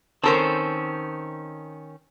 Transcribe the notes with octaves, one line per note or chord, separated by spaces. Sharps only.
D#3 C4 C#4 A4 A#4 C5 A5